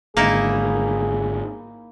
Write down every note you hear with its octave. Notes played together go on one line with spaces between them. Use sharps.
G#1 G#2 D3 A#3 D#4 E4 G#4